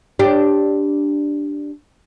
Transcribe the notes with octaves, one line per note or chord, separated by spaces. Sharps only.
D4 G4